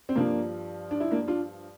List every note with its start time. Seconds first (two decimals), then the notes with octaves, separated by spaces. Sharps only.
0.09 C4
0.16 G2 F3 A#3 D4
0.91 D4
1.00 E4
1.11 A#3 D4
1.28 D4 F4